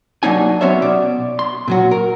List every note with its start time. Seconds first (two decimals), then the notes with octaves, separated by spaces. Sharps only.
0.23 F#3 A#3 D4 D#4 G#5
0.61 F#3 B3 C#4 C5 C#5 E5
0.82 B2 D5
1.39 C6
1.68 A#2 F#3 F#4
1.91 A#4